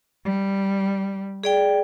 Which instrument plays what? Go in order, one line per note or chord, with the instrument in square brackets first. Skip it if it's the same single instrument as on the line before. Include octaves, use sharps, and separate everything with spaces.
[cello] G3
[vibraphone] G#4 D5 G5